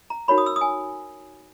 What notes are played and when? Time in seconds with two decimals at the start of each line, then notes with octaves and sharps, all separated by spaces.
0.10 A#5
0.28 D#4 F#4 A#4 C#5 B5
0.38 D#6
0.46 E6
0.56 D#6
0.61 G#5